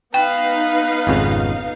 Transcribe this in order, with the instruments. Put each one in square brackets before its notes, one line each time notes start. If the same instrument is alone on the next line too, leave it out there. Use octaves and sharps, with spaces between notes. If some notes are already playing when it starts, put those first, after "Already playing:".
[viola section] B3 D#4 F5 [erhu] B4 [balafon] G5
[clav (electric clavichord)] G#1 F2 C#3